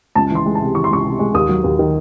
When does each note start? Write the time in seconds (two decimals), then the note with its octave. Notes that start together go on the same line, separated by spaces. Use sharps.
0.15 C#2 A5
0.30 E3
0.35 C6
0.46 G#3
0.55 A5
0.61 C3
0.75 E3 C#6
0.84 C6
0.91 C#2 C#6
1.05 C3
1.19 G#3
1.34 D#2 D#6
1.49 F#3
1.64 D#2
1.79 D#3